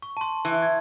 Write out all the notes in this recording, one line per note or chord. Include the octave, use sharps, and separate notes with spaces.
C#6
A5 C6
E3
G#6